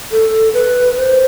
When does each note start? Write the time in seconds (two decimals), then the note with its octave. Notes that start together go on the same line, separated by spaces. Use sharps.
0.11 A4
0.53 B4
0.97 C5